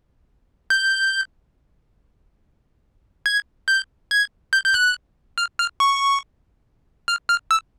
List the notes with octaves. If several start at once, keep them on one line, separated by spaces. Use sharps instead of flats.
G6
G#6
G6
G#6
G6
G6
F#6
F6
F6
C#6
F6
F6
E6